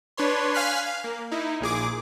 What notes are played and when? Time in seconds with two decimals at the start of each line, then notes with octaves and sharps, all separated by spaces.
0.17 D4 B4 C#5 C6
0.54 F5 G#5 F6 F#6 B6 C7
0.86 F5
1.04 A#3
1.31 D#4 E4
1.60 A#1 A#2 G#4 D6